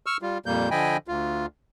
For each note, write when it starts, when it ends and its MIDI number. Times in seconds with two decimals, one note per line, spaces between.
0.06 0.17 85
0.06 0.17 88
0.06 0.17 89
0.22 0.38 55
0.22 0.38 65
0.46 0.69 41
0.46 0.69 46
0.46 0.69 55
0.46 0.69 58
0.46 0.69 91
0.71 0.97 50
0.71 0.97 53
0.71 0.97 75
0.71 0.97 79
0.71 0.97 80
0.71 0.97 83
1.08 1.46 38
1.08 1.46 65